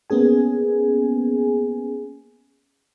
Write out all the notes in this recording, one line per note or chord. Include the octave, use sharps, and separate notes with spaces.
A#3 B3 C#4 G#4 G#5